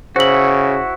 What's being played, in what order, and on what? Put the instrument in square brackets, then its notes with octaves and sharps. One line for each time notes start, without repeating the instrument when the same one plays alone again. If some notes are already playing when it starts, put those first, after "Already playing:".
[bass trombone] C#3 [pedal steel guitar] E4 F#4 [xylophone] C5 F#7